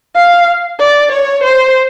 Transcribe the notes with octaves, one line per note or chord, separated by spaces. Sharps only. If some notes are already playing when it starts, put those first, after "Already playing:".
F5
D5
C#5
C5